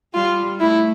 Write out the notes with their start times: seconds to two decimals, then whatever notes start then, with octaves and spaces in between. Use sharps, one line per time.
0.14 G3 F4
0.60 A3 E4